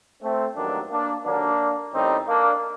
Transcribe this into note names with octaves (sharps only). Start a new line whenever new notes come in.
A3 C4
A1 G2 D#3 F#3 A#3 D4
A#3 D4
D#2 D3 F#3 A#3 D4
A1 A2 G3 C4 D#4
A#3 D4